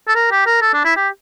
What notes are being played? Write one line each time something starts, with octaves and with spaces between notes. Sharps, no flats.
A4
A#4
G4
A#4
A4
D4
E4
G4